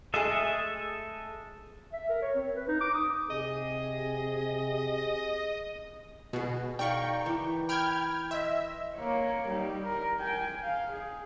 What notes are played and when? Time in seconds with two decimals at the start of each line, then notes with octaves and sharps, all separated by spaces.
0.14 G#3 A3 G#4 A4 D#5 E5
1.93 E5
2.10 A#4
2.22 C#5
2.35 C4
2.55 B4
2.68 D#4
2.81 D6
2.95 D#6
3.30 C3 G#4 D#5
6.33 B2 F#4 G#4
6.79 D#4 A#4 D5 F5 G5 B5 C#6
7.26 E3 B4 D6
7.69 G5 B5 F6 G6 G#6
8.31 D#5 E5 C6
8.96 A#3 C#5
9.48 G3 D#4
9.84 A#4
10.20 G5 G#5
10.64 F5
10.92 G#4